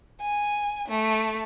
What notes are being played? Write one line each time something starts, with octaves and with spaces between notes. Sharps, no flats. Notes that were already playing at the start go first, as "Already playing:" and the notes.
G#5
A3